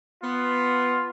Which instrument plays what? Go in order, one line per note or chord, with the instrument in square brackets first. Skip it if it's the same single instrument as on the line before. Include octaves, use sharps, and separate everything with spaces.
[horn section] B3 [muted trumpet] F4